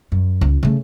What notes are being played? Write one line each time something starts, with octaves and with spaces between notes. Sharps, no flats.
F#2
C#2
C#3 A3